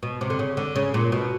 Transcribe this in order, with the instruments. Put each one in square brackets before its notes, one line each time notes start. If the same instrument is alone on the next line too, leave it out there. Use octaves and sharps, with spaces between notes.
[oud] B2
C3
D3
C#3
D3
C#3
A#2
B2